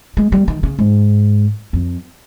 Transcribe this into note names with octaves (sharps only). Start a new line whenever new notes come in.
G#3
G3
D#3
C#3
G#2
F2